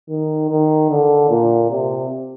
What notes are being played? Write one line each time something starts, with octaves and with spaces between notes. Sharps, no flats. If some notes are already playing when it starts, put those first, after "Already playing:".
D#3
D#3
D3
A#2
C3